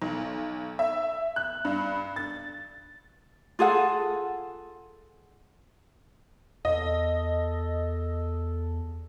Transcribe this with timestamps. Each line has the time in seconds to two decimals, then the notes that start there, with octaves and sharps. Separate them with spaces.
0.02 B1
0.79 E5
1.36 F#6
1.65 G2
2.16 A6
3.59 F4 G#4 A4 F#5
6.65 E2 A4 D#5